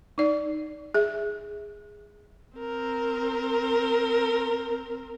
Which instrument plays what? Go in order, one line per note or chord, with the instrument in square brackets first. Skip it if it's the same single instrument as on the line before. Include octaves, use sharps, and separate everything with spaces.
[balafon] D#4 D5
G#4 E5
[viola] C4 A#4